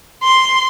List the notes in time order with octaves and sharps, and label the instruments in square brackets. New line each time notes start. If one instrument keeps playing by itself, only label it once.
[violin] C6